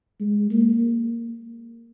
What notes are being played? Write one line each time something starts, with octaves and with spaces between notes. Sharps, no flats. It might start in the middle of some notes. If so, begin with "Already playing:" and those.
G#3
A#3